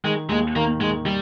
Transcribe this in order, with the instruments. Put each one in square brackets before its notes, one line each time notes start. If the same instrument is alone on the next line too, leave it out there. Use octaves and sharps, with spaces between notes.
[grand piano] D#3 [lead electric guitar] G#3
[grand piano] D#2 [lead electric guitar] G#3
[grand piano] D#3 [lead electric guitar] A#3
[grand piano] D#3 [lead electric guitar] G#3
[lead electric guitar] G3